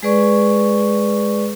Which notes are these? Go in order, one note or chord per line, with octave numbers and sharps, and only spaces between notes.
G#3 G#4 B4 D5 C#6